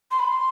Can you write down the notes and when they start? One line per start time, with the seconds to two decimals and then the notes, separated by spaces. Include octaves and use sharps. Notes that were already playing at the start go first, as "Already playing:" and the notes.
0.11 C6
0.19 B5
0.27 C6